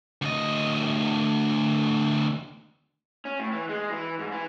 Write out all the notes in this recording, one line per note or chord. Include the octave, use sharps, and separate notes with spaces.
D2 D#5
C#4
A2
E3
G#3
E3
G#2
E3